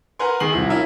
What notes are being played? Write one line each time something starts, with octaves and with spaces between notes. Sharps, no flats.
A#4 B4 F#5 G#5 C6
D#3 G#4 C7 F#7
C2 F3 E4
C#4 E4 F4 A#4